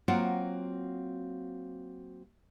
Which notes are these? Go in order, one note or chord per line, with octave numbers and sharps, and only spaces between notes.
F#3 A#3 C4 F4 F#4 F#5